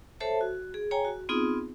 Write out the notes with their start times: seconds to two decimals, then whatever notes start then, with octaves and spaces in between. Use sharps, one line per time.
0.20 A4 C5 C#5 E5 A5
0.41 F#4
0.74 G#4
0.91 G#4 C#5 G5 G#5 A#5
1.05 F#4
1.29 B3 C4 D#4 F4 G#4 D#6